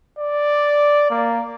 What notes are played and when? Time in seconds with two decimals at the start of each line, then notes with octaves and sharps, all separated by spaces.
0.19 D5
1.10 A#3